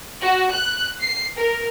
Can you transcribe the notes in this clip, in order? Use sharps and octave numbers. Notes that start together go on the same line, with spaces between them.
F#4
F#6
C7
A#4